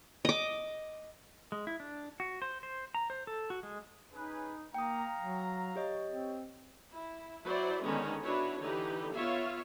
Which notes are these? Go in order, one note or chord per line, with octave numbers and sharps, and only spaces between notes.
D#5 D6
G#3
E4
D4
F#4
C5
C5
A#5
C5
A4
F#4
G#3
C#4 D#4 G#4 B4
A#3 F5 G5 A#5 D#6
F#3
G4 C#5 D#5
C4
E4
F#3 E4 C5 D5
D3 D#3 G#3 B3 C#4 D#4
D4 E4 F#4 B4 C#5
D3 E3 D#4 G4 B4
B3 F4 C#5 E5 F5